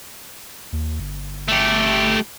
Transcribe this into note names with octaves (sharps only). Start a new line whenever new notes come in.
D#2
G1
A3 G4